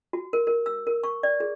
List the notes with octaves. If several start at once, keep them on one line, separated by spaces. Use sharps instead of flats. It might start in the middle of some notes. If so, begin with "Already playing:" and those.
F#4
A#4
A#4
E6
A#4
C#6
D5
G#4